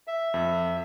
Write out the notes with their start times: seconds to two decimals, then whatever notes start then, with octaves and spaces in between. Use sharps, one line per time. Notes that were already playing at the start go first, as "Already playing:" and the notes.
0.07 E5
0.34 F2